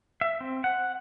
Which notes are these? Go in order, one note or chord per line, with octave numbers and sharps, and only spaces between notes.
E5
C4
F#5